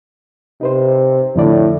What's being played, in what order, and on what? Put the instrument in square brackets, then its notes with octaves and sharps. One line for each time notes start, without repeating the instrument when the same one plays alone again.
[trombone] C3 [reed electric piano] D#4 B4 C5
[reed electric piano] F2 D3 D5 [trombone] A2